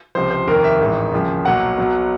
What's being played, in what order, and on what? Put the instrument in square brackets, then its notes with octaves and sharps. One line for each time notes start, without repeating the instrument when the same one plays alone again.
[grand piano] C#2 C3 F3 C5
C5
F1 D#2 D#3 A#4
E5
A1 G#2 D#3
D#2 C#3 F3
B1 A#2 F#3 F#5
B1 B2 F#3